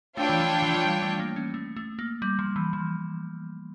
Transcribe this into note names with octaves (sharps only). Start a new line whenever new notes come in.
A3 D4 F4 C#5 G5
E3
F3
E3
F3
G3
A3
A#3
C#4
A3
A3
A#3
G3
F3
E3
F3